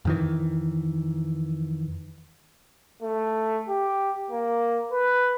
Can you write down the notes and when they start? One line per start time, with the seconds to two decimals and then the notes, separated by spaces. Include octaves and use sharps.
0.05 F2 D#3 E3
3.02 A3
3.68 G4
4.30 A#3
4.92 B4